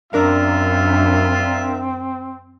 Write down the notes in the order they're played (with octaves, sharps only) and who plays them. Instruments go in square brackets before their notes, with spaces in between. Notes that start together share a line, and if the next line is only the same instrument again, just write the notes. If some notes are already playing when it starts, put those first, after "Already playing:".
[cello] F#2 [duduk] C4 [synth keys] D4 A#4 F5 [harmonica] F4 E5